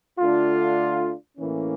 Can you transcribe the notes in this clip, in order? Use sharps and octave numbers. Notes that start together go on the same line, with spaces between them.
D3 A3 D4 F4
A2 E3 A#3 C#4